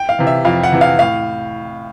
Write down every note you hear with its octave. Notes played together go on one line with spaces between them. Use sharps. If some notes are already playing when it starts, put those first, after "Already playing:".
Already playing: G5
F5
C3 E3
E5
F2 F5
F#5
C3 E3
F5
A2 F5